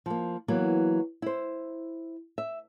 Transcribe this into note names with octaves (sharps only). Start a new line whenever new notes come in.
F3 A#3
E3 F#3 A#3 B3
E4 C5
E5